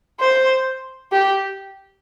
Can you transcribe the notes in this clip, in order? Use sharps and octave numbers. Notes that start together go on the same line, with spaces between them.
C5
G4